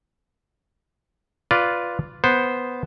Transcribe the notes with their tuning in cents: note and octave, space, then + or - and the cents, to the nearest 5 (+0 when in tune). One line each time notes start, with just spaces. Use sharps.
F4 +0 B4 +0 D5 -10
B3 +0 C5 +0